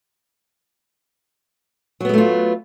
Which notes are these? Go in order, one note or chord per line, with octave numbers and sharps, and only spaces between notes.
F#3 G#3 A3 B3 F4